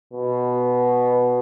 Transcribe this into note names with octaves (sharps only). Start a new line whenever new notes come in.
B2